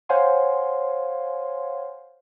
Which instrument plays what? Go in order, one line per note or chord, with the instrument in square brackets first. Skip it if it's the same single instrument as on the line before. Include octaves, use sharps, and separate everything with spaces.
[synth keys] C5 C#5 F5 F#5 G#5 C6